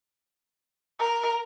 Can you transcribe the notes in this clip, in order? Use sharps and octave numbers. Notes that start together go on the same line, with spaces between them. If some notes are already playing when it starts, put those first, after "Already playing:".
A#4